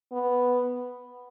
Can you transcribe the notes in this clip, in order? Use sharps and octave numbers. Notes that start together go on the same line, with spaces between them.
B3